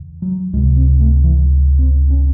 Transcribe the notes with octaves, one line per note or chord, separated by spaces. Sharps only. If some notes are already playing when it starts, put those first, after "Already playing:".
Already playing: E2 C#3
F#3
C#2 C3 G#3
C4
A3
E3
C4
C#4